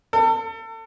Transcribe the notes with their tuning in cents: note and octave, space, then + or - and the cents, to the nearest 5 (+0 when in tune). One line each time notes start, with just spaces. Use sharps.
A4 +35